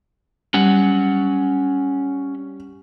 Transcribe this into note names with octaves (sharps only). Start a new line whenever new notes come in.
G3 C#4 F#5